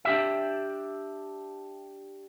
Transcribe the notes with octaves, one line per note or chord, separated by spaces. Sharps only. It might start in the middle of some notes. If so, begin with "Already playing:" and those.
D4 G4 E5